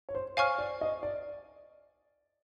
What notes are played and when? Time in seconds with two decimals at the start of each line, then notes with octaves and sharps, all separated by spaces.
0.09 C#5
0.15 C5
0.37 C5 C#5 F5 G#5 C#6 F6
0.59 D5
0.81 D#5
1.03 D5